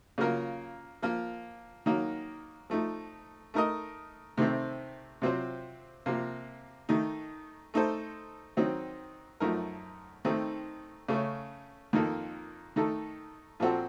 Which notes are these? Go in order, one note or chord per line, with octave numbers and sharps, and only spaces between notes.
C#3 F#3 A#3 F4 A#4
F3 A#3 F4
D#3 F#3 A#3 D#4
F3 A3 D#4
A3 D#4 A#4 D#5
C3 D#3 A3 C4
C3 F#3 C4 F4 C5
C3 F3 A#3
D#3 A3 D#4
A3 D#4 A4 C5
D#3 F#3 C4 D#4
F#2 F3 A3 D#4 A#4
D#3 A3 C4 D#4
C#3 A3 C#4
F2 D#3 A#3 D#4 A4
D#3 A3 D#4 A4
A#2 F3 C4 F#4 A4